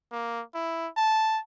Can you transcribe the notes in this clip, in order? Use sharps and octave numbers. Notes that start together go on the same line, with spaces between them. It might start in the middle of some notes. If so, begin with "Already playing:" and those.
A#3
E4
A5